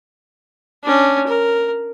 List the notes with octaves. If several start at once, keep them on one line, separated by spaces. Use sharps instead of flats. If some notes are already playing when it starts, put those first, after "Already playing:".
C#4 D4
A#4